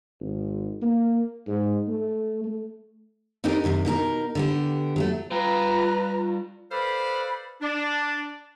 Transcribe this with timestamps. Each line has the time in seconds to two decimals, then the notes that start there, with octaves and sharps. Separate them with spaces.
0.21 G#1
0.82 A#3
1.47 G#2
1.88 A3
2.44 A3
3.44 C4 D4 D#4 G4 A4 A#4
3.64 F#2 A2 C3 D#3
3.85 B2 D#4 G#4 A#4
4.35 D3 B3 G4
4.96 F#3 G#3 A3
5.32 G3 F4 B4 F5 G5 A#5
6.72 A4 B4 C5 D5 F5 B5
7.62 D4